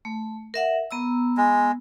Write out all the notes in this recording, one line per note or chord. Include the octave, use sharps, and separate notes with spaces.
A3
A#4 E5 F#5
B3 A#5 E6
G#3